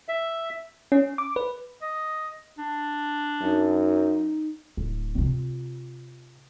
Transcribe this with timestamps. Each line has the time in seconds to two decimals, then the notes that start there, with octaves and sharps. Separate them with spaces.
0.09 E5
0.92 C#4
1.18 D6
1.36 B4
1.82 D#5
2.58 D4
3.42 F#2 D#4
4.77 D1
5.18 C3 F4